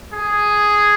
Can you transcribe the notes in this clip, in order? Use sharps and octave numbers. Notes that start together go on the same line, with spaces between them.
G#4